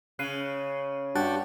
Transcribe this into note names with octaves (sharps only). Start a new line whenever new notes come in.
C#3 F#6 C7 D#7
G2 F#4 G4 A5 F#6 A6